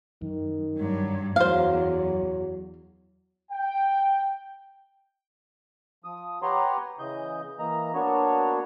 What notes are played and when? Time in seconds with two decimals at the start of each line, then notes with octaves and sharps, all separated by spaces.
0.22 F#2 D#3
0.77 G2 F#3
1.36 E2 F#3 C5 F5
3.52 G5
6.04 F3 D#6
6.42 G4 B4 C#5 F#5 A#5 C6
6.99 C#3 E3 D#5 G6
7.59 E3 A#3 D#5 A#5
7.94 A#3 B3 D4 F#4 C#5